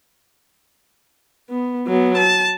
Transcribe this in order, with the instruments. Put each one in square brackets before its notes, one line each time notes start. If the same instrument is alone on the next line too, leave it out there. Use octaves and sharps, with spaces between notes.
[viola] B3
F#3 B3
A5